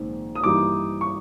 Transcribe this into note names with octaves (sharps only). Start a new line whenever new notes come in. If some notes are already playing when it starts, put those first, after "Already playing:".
Already playing: A#1 G#2 D#3 C4
D#6
G2 E3 G3 A#3 D#4 D6
C#6